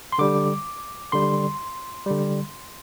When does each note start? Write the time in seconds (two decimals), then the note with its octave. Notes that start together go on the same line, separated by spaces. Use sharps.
0.12 C6
0.18 D3 G3 D6
1.12 D3 G3 C6
2.06 D3 G3